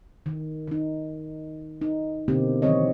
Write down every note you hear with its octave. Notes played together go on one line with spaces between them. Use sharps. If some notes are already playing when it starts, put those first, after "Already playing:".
D#3
D#3 D#4
D#4
B2 D3 A#3 C4 G4
D#3 E3 F#3 C4 C#5 D#5